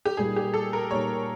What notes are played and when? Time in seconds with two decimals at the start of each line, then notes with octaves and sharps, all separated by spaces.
0.05 G4
0.17 A#2 G3 A#3 D#4 G#4
0.36 G4
0.54 A4
0.73 A#4
0.91 A#2 G3 A#3 D#4 C#5